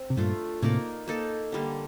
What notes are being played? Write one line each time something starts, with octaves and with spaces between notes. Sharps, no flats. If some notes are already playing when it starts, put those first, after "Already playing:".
Already playing: C4
C3
G2 A#2 A3 D4 F4
A2 C3 A#3 D#4 A#4 D5
A#3 D#4 A4
D3 G3 A#3